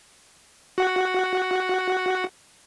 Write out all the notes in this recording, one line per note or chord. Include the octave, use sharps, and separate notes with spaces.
F#4 F#5